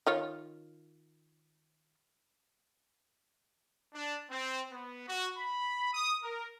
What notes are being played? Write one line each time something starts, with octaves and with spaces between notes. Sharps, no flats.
D#3 F4 C#5
D4
C4
B3
F#4
B5
D#6
A#4